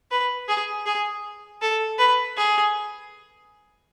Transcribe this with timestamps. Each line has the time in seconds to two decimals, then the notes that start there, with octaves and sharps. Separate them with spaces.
0.11 B4
0.48 G#4
0.86 G#4
1.61 A4
1.98 B4
2.37 G#4